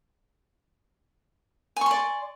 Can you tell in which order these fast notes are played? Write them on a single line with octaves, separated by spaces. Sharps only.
G#5 C#6 C6 D5